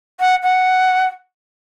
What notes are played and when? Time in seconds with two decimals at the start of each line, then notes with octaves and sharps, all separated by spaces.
0.20 F#5
0.43 F#5